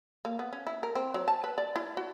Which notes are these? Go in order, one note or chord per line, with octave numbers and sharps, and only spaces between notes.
A#3
B3
C#4
E4
A#4
C4
F#3
A5
B4
D5
E4
F#4